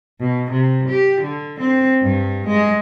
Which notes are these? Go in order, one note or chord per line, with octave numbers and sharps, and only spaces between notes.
B2
C3
G4
D3
C4
G2
G#3